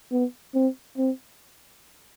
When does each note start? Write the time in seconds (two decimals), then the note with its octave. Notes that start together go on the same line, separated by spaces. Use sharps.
0.12 B3
0.55 C4
0.98 C4